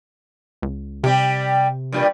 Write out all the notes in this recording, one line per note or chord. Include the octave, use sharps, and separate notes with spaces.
C#2
C3 G3 G4
G2 A#2 G3